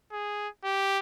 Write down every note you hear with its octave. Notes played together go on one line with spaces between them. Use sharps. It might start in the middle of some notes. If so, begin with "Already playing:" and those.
G#4
G4